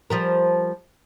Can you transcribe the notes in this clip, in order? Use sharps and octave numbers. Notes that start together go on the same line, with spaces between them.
F3 G3 A#4